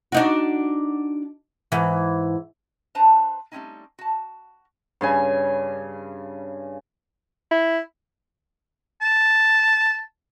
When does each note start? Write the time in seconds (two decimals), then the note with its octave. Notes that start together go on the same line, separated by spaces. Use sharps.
0.12 D4 D#4 F#4
1.72 G#2 E3
2.95 D4 B4 C5 A5 A#5
3.52 G3 A3 A#3 C4 C#4 D#4
3.99 F#4 A5
5.01 G2 C#3 G#5
7.51 E4
9.01 A5